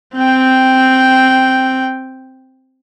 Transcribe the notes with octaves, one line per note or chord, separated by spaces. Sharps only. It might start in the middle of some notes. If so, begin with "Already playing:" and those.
C4 G5